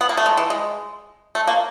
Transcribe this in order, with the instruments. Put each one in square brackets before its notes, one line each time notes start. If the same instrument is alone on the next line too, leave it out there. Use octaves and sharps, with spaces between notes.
[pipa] B3
A#3
A3
G#3
E3
G#3
A3
A#3